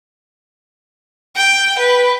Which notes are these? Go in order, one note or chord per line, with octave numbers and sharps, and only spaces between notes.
G5
B4